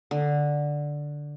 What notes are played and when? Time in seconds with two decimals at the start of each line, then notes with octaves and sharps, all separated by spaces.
0.11 D3